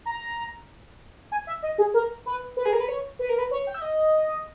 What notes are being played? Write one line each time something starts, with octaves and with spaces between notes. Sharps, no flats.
A#5
G#5
E5
D#5
G#4
A#4
B4
B4
G#4
A#4
B4
C#5
B4
A#4
B4
C#5
G5
E5
D#5